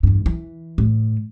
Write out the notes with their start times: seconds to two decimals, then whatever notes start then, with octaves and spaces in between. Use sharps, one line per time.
0.03 E2 G2
0.26 E3
0.78 A2